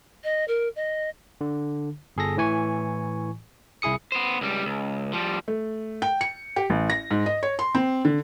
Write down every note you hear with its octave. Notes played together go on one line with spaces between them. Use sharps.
D#5
A#4
D#5
D3
G1 G#4 A4 A#6
A2 E3 G#5 C#6
C2 E4 G#4 D#6 C#7
B3 C5
C#2 G3
C#2
F3 G3
A3
G5
C#7
G4
A1
A#6
G#2
D#5
C#5
C6
C4
D3